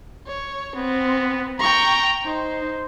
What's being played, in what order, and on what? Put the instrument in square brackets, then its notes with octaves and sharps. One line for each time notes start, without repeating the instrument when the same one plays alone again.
[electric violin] C#5
[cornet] B3 [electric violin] C4
[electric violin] G5 C#6 [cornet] A#5
[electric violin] D#4 [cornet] C5